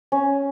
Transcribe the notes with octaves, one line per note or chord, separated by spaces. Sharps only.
C#4